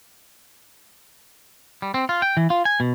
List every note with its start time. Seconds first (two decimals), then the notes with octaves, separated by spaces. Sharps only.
1.82 G3
1.94 C4
2.09 F4
2.22 G5
2.37 E3
2.50 F4
2.65 G#5
2.80 B2